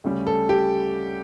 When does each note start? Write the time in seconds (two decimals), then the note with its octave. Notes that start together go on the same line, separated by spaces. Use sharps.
0.04 D2 C#3 G3
0.27 A4
0.49 G4